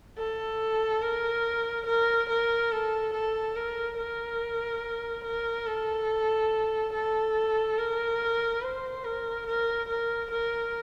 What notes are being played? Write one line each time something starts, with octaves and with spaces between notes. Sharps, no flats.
A4
A#4
A#4
A#4
A4
A4
A#4
A#4
A#4
A4
A4
A#4
C5
A#4
A#4
A#4
A#4